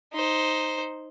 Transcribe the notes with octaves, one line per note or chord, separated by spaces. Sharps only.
D#4 C5